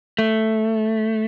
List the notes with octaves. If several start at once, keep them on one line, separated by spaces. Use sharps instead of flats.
A3